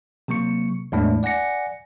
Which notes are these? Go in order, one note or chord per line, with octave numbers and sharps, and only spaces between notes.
C3 F#3 A#3 C#6 C#7
E2 A2 G#3 A3 D4
D5 F#5 G#5 A#6 C#7